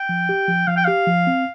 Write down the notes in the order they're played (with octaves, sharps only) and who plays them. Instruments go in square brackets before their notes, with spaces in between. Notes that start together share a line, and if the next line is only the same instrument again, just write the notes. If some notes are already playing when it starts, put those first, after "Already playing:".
Already playing: [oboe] G5
[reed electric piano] F3
G4
F3
[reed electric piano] F3 [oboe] F5
[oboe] G5
[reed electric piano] G4 [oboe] F5
[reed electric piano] F3
C4